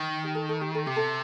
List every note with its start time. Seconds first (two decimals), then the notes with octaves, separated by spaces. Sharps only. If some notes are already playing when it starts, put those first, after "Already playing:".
Already playing: D#3
0.24 G4
0.35 A4
0.49 A4
0.61 G4
0.75 A4
0.86 C3 G4
0.96 A4